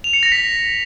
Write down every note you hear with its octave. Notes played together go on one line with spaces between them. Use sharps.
F7
C#7
A#6
B6